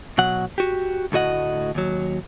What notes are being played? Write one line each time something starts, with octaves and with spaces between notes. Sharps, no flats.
B2 F#3 F#5
F#4 G4
D2 A2 F#4 D#5 F#5
D#2 F#3